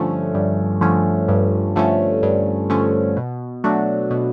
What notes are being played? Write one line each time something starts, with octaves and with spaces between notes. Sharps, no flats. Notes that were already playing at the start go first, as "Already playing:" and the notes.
Already playing: G2 D3 F3 A3 C#4
G2
D3 F3 A3 C#4
G2
D3 F3 A3 C#4
G2
D3 F3 A3 C#4
B2
F#3 A3 D4 F#4
B2